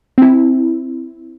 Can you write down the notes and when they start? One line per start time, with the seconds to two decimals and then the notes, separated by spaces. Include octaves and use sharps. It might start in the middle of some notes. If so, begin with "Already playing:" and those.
0.18 C4 E4